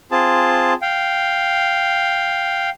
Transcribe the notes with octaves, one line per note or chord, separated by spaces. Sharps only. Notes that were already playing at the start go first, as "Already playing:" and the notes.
C4 F4 G#4 A5
F5 G5